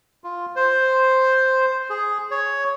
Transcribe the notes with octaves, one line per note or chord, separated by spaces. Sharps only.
F4
C5
G#4
C#5